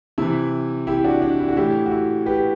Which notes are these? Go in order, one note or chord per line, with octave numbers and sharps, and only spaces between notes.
C3 E3 E4
E4 G4
D4 F#4
D4
E4
F#4
A2 E3 E4 G4
F#4
E4
G4 B4